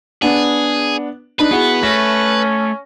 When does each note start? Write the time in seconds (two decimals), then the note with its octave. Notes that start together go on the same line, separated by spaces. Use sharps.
0.22 B3 D4 G#4
1.39 D4 D#4 B4
1.51 B3 E4 F#4 G#4
1.83 A3 C#4 A#6